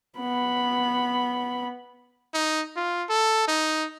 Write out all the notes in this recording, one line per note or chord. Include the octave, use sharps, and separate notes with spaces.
B3 B5
D#4
F4
A4
D#4